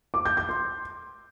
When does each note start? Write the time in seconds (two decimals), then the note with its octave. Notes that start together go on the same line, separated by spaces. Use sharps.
0.14 D6
0.25 G6
0.37 G6
0.49 C6